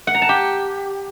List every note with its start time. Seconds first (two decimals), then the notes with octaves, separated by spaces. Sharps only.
0.07 F#5
0.15 A#5
0.22 A5
0.29 G4